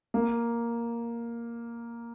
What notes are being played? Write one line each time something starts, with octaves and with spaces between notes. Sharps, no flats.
A#3